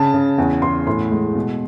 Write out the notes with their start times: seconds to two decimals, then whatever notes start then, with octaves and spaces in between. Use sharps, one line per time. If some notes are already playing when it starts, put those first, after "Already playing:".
Already playing: C#3 A5
0.14 C#3
0.38 E2
0.62 E2 C6
0.87 A2 C6
1.11 G#3
1.35 B2